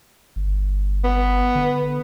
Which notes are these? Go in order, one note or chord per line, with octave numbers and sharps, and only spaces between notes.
G1
B3
D3